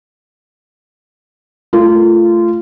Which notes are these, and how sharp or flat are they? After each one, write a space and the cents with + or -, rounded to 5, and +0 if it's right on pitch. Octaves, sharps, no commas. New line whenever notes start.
A3 +0 F4 -20